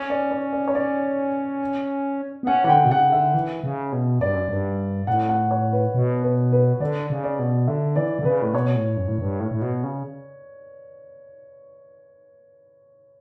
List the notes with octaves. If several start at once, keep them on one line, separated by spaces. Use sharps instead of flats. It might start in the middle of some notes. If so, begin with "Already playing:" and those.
Already playing: C#4
D5
C#5
D5
C#5
D5
B3
C#4 F#5
E3 F#5
D3 G5
B2
C#3 F#5
D3 E5
E3
C#3
B2
G2 D5
F#2
G2
A2 F#5
F#5
C#5
B4
B2
B4
B4
D3 D5
C#3
D5
B2
D3 E5
E3 D5
D3
C#3 B4
A2
B2 C#5
A2
F#2
A2
G2
A2
A2
B2
C#3